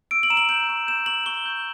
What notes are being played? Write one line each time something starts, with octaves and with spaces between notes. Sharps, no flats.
E6 D7
F#7
A#5 E7
F#7
G6 F#7
C#6
G6 E7
C#6 F#7
C#6 G7
G6